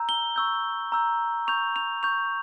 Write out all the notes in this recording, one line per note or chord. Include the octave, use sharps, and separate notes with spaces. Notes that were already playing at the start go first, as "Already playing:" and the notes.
Already playing: A#5 E6 G6
G7
C#6 E6 G6
A#5 E6 G6
C#6 G6 F7
F7
C#6 G6 F7